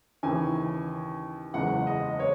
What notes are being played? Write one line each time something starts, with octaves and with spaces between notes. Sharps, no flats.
D#2 C#3 E3 G#5
F#1 E2 C#3 G#3 F#5
D#5
C#5